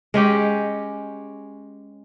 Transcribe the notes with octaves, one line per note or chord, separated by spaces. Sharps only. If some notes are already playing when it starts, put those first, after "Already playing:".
G#3 C#4 G4